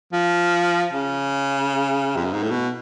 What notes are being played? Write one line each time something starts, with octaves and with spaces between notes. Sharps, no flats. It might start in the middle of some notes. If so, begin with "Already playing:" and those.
F3
C#3
F2
F#2
G#2
A2
B2